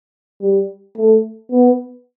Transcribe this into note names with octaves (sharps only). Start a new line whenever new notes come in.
G3
A3
B3